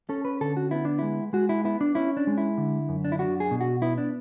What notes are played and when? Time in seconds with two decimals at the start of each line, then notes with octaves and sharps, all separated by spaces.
0.09 C#4 A4
0.25 B4
0.41 D3 A4
0.57 F#4
0.71 B3 E4
0.85 D4
0.99 G#3 E4
1.33 G#3 F#4
1.49 E4
1.64 B3 E4
1.81 D4
1.95 C#4 E4
2.17 D4
2.27 G#3
2.38 E4
2.58 D3
2.89 F#2
3.05 D4
3.12 E4
3.19 D4 F#4
3.40 G#4
3.51 B2
3.61 F#4
3.82 B3 E4
3.98 D4